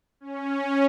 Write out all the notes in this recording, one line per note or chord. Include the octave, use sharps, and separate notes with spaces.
C#4